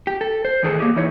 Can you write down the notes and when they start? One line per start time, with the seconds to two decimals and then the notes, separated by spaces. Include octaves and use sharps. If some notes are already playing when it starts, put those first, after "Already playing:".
0.07 G4
0.21 A4
0.45 C5
0.63 E2 A2 D#3 G#4 A4 A5
0.79 A#3 G4 G#4
0.96 E3 D#4 E4 C#5